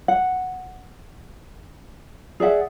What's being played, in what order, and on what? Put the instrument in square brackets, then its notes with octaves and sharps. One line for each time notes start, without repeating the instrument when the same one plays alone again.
[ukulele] F#5
G#4 D5 E5 F#5